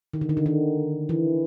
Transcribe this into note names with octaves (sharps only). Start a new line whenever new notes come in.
D#3
D3
D#3
D3
D#3
E3